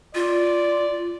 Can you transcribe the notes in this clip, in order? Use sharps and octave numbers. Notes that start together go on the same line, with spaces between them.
F4 D5